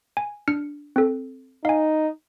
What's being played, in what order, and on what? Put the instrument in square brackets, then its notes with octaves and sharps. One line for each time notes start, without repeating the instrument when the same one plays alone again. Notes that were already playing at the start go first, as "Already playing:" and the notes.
[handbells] G#5
D4 F6 C#7
C4 A4
[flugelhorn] D#4 [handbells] F5 G#5